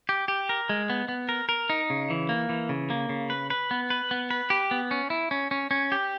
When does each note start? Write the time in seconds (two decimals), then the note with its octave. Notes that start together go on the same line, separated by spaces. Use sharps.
0.09 G4
0.28 G4
0.49 A#4
0.69 G#3
0.90 B3
1.09 B3
1.29 A#4
1.49 A#4
1.70 D#4
1.90 C#3
2.10 E3
2.29 A#3
2.49 E3
2.69 C#3
2.90 A#3
3.09 C#3
3.30 B4
3.50 B4
3.71 B3
3.90 B4
4.11 B3
4.30 B4
4.50 G4
4.71 B3
4.91 C#4
5.10 E4
5.31 C#4
5.51 C#4
5.71 C#4
5.92 G4